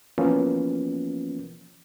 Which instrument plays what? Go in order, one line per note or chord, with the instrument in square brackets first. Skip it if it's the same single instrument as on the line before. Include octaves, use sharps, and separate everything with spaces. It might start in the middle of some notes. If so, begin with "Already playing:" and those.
[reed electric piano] E3 F3 A#3 B3 C#4 F4